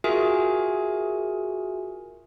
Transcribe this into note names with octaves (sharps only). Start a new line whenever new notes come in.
F4 F#4 G#4 A#4 E5 G#5